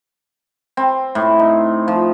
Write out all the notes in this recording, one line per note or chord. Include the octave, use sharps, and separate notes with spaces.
C4
A2
D#4
F3